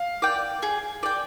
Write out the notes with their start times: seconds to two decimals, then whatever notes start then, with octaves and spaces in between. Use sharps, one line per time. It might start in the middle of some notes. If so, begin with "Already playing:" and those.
Already playing: F5
0.22 D5 G5
0.63 G#4
1.03 D5 G5